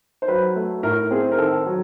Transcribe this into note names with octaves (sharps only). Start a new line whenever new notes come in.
C5
F#3 B4
A3
A2 A#4
C4 G#4
A#4
D#3 A4
F#3